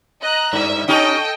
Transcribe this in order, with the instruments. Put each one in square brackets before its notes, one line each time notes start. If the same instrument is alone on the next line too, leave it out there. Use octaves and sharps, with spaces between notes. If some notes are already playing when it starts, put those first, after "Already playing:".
[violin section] D#5 A#5 F#6
[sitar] G2 [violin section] E5
[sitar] C#4 D#4 G4 [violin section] A4 D#5 G5